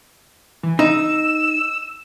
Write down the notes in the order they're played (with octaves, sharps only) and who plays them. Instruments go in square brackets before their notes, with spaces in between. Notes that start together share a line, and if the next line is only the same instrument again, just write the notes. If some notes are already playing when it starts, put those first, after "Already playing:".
[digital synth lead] E3
[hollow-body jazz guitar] D#4 [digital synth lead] E6 [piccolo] E7